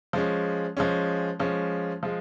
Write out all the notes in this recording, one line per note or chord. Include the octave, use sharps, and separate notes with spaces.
F3 G#3 C#4
F3 G#3 C#4
F3 G#3 C#4
F3 G#3